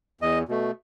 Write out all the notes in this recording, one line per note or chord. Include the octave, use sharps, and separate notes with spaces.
E2 D#5
B2 A3